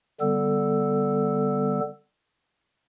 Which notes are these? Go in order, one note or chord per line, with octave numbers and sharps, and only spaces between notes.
D3 G3 B3 A4